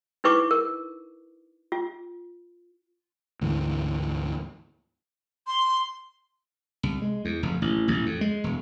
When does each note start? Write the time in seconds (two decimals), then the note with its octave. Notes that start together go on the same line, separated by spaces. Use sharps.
0.24 D#4 E4 B4 C#6 D6
0.51 A#4
1.72 F4
3.41 D2 G#2 E3
5.47 C6
6.83 C2
7.02 G#3
7.25 E2
7.43 F1
7.62 A1
7.88 A1
8.06 F2
8.21 G#3
8.44 E1